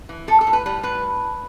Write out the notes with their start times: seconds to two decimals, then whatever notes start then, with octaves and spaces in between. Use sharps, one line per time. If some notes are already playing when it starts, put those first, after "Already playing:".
0.09 E3
0.27 A2 A4
0.41 A4
0.47 A2
0.53 B4
0.66 G3 B4
0.83 A2 B4